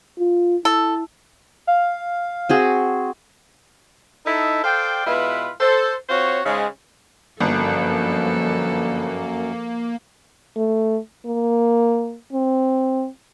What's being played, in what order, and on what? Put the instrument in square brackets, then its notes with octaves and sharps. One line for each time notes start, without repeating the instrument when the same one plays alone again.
[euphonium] F4
[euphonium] E4 [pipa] A4
[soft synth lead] F5
[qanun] C4 F#4 G#4
[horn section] D#4 E4 A4
A4 C5 D5 F5 G5
B2 G#3 E4 F4 B4
A4 C5
C4 F4 F#4 C5 C#5
G#2 C#3 G#3
[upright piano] G1 [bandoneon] F#2 [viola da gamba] F3 A4 [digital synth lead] A#3
[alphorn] A3
A#3
C4